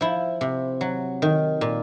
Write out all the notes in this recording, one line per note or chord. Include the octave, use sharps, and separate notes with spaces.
F3 E4
C3
F#3
D#3
A#2